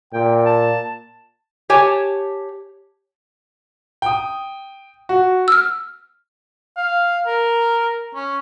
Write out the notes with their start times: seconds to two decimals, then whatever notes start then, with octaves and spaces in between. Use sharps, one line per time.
0.13 A#2 G5
0.46 A5
1.70 G4 C#5 G#5 A5
4.02 G5 D#6
5.09 F#4
5.48 E6 F6
6.77 F5
7.27 A#4
8.15 C#4